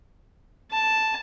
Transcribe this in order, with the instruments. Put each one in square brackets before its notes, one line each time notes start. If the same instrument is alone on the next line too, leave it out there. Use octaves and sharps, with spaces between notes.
[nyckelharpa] A5